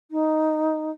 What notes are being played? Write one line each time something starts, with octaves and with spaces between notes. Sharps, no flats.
D#4